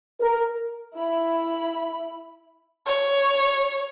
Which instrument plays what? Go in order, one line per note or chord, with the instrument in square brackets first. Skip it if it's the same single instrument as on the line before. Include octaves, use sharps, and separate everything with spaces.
[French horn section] A#4
[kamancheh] E4 B5
[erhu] C#5